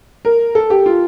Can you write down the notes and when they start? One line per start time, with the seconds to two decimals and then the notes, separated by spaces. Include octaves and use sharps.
0.25 A#4
0.55 A4
0.70 G4
0.86 F4